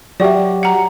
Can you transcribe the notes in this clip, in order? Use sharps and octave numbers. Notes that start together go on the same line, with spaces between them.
F#3 F#4 G4 D5 E5
F#5 A#5